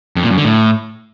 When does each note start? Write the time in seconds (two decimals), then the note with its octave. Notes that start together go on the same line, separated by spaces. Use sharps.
0.16 F2
0.24 A#2
0.31 F#2
0.38 D3
0.45 A2